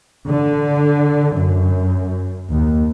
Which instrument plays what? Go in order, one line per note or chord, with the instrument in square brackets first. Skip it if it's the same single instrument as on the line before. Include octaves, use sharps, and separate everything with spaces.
[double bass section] D3
F#2
D#2